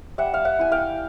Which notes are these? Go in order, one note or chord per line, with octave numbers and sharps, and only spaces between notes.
G3 E5 F#5
F5
E5 F#5
E4 G#5
F5 G5